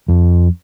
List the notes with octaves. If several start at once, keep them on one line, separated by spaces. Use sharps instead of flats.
F2